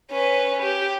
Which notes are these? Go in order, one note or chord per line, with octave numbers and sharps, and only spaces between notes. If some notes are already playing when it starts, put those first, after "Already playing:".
C#4 B4
G4